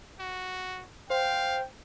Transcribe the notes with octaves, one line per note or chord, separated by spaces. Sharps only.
F#4
C5 F5 G5